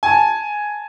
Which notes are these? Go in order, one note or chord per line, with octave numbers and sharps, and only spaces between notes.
G#5 A5